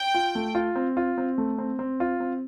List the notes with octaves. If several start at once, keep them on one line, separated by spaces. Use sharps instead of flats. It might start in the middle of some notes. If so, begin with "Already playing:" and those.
Already playing: G5
F4
A3
F4
C4
F4
C4
A3
C4
C4
F4
C4